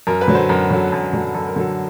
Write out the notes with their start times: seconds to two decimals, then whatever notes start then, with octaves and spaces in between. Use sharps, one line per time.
0.07 F#2 A#4
0.21 B4
0.28 D3 F#3
0.35 C5
0.49 F#2 A#4
0.70 D3 F#3
0.92 F#2
1.13 D3 F#3
1.34 F#2 A4
1.47 A#4
1.56 D3 F#3 A4